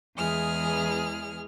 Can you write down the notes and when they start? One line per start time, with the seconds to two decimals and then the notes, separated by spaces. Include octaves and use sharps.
0.17 E2 E3 G#3 G#4 F6